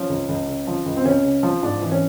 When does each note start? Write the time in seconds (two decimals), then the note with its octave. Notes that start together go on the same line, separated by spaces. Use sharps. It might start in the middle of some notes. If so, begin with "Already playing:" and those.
Already playing: F3 C#4
0.10 C#2
0.29 C#2
0.48 C#3
0.67 F3
0.86 C#2
0.97 C4
1.06 C#2 C#4
1.24 C#3
1.43 F3
1.62 G#2 D4
1.82 E3
1.92 C#4